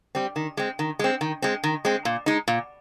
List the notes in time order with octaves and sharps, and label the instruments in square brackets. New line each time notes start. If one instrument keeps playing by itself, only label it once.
[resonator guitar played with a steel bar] G3 C4
D#3
G#3 C4
D#3
G#3 C4
D#3
G#3 C4
D#3
G#3 C4
A#2
G#3 D#4
A#2